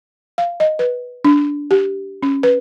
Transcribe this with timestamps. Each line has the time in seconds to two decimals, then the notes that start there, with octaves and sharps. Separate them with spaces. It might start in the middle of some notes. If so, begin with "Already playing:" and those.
0.38 F5
0.60 D#5
0.79 B4
1.25 D4
1.71 G4
2.23 C#4
2.43 B4